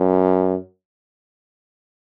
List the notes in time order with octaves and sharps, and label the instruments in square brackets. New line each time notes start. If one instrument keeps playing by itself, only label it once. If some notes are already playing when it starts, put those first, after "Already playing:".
Already playing: [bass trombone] F#2